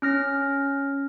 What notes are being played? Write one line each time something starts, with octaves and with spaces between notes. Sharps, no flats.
C#4 F6 A#6